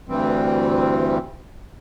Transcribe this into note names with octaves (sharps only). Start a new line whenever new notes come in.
D2 G2 E3 G3 C4